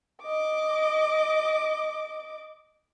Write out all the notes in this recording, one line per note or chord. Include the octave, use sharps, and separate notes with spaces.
D#5 D6